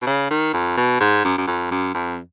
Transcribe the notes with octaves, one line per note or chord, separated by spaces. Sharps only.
B2
C#3
D#3
F2
B2
G#2
F#2
F#2
F2
F#2
F2